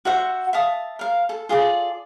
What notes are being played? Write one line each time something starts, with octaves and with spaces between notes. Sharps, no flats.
F#4 C5 E5 F#5
E5 F5 A5 D#6
A#4 F5
A4
F4 G#4 A4 D5